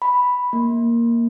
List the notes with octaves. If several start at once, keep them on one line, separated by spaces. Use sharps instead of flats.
B5
A#3